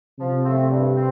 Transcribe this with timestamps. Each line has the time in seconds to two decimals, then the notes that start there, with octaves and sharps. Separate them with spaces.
0.18 C3 F3
0.44 A3 C4
0.70 G2
0.96 C4